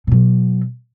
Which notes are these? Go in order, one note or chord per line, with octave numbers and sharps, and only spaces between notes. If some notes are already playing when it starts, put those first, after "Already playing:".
B2 F#3